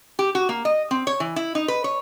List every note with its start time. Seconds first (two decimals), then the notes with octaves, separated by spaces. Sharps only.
0.19 G4
0.35 F#4
0.49 A#3
0.65 D#5
0.91 C4
1.07 C#5
1.20 E3
1.36 E4
1.55 D#4
1.68 B4
1.84 C#5